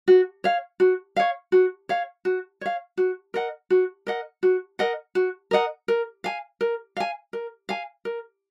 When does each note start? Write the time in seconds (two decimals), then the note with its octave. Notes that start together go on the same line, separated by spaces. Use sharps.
0.08 F#4
0.44 C#5 F5
0.80 F#4
1.16 C#5 F5
1.52 F#4
1.89 C#5 F5
2.25 F#4
2.61 C#5 F5
2.97 F#4
3.34 A#4 D#5 F#5
3.70 F#4
4.07 A#4 D#5 F#5
4.43 F#4
4.79 A#4 D#5 F#5
5.15 F#4
5.51 A#4 D#5 F#5
5.88 A#4
6.24 F5 G#5
6.61 A#4
6.97 F5 G#5
7.33 A#4
7.69 F5 G#5
8.05 A#4